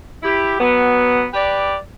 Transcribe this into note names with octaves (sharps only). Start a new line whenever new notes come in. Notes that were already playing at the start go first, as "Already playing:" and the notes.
E4 G4
F#3 B3
G4 B4 D5